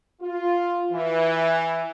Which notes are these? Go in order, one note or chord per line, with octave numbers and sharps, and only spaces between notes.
F4
E3